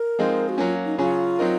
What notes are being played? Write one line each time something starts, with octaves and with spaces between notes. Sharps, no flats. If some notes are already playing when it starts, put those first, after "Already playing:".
Already playing: A#4
F3 G#3 C4 D#4
F#4
F#3 A#3 C#4 F4
D#4
C#3 F#3 C#4 F4 G#4
F#3 C4 D#4 A#4